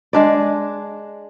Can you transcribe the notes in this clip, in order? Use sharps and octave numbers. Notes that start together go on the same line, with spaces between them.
G#3 D4 D5